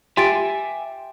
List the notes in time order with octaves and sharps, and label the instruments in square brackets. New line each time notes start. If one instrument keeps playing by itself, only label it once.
[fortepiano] G4 [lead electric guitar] E5 G#5 [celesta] C6 A6 D7